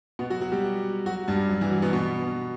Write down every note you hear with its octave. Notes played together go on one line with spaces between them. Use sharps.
B2 B3
F#3 F#4
F#3 F#4
G3 G4
F#3 F#4
G2 G3
F#3
E3
F#3
B2 B3
B2 B3